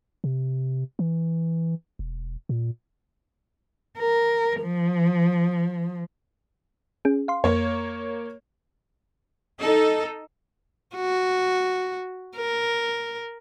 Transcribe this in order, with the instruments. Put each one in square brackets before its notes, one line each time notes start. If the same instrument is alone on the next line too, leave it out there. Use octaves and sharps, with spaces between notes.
[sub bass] C3
E3
E1
A#2
[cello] A#4
F3
[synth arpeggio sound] C#4 G#4
F5 C6
[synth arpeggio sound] F2 [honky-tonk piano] A#3 C#5
[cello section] D#4 A4
[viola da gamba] F#4
A#4